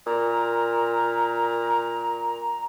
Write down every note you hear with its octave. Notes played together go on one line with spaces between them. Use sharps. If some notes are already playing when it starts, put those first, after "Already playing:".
A#2 A#5